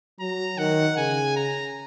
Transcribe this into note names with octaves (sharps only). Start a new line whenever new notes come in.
F#3 A#5
D#3 F#5
C#3 G#5
A#5